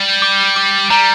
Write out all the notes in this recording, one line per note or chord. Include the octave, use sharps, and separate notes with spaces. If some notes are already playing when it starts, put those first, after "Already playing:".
Already playing: G3 G7
D6
D6
G3 A#5